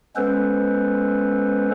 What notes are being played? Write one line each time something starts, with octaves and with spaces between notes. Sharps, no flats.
G#3 B3 C#4 A4 B4 C5